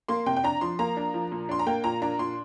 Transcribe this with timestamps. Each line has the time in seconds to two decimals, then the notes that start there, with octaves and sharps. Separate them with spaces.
0.08 A#3 C6
0.26 C3 G5
0.37 G5
0.44 D4 A#5
0.61 F3 C6
0.79 A#3 A#5
0.97 D4
1.14 F3
1.31 A#2
1.49 D4 C6
1.59 A#5
1.67 A#3 G5
1.84 A#2 A#5
2.02 D4 A#5
2.19 A#2 C6